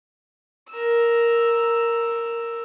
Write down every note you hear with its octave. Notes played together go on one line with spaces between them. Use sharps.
A#4 E6